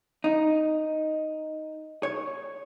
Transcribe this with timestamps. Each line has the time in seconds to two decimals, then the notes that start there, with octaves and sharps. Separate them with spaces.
0.24 D#4
2.03 C#5